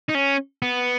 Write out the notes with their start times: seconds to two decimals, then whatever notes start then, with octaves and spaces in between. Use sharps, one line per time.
0.09 D#4
0.14 C#4
0.62 B3